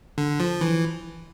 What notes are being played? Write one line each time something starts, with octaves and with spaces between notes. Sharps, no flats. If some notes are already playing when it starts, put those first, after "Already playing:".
D3
F3
E3